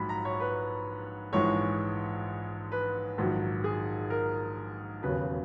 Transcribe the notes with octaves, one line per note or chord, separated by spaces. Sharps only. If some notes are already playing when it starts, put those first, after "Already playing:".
Already playing: A#1 G#2 F#3 B5
A#5
C#5
B4
A#1 G#2 E3 G#3 C#5
B4
A#1 G#2 D#3 F#3
G#4
A#4
E1 D#2 C#3 F#3 B4